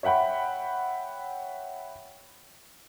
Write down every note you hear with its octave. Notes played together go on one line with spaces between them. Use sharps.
C#5 E5 F#5 G5 B5